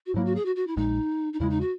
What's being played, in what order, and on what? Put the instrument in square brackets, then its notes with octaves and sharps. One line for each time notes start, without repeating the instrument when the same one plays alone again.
[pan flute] F#4
[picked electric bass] G#2 F#3 A#3 [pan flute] E4
[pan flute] F#4
G#4
F#4
F#4
E4
[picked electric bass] A#1 A#2 G#3 [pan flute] D#4
[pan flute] D#4
[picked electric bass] E2 C#3 G#3 [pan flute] E4
[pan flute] D#4
F#4